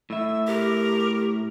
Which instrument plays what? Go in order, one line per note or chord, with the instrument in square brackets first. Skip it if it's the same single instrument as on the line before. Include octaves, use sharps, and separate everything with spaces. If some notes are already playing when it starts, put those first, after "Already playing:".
[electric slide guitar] A2 E5 [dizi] E6
[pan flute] G4 [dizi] A#4